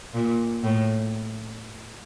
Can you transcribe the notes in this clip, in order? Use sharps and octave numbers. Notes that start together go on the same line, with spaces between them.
A#2
A2